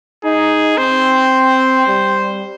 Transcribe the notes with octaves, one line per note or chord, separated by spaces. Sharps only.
D#4 G#4
C4 C5
G3